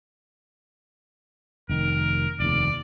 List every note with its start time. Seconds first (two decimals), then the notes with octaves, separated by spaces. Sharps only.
1.70 F1 D#3 A#4
2.40 F1 D#2 D5